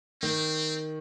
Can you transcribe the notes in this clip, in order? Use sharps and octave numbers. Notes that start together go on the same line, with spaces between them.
D#3 C4